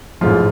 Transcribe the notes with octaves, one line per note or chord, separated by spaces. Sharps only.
A1 G#2 F3 F4